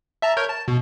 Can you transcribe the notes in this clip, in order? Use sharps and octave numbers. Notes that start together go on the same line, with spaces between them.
E5 A5 A#5
A#4 C#5 G6
A5
B2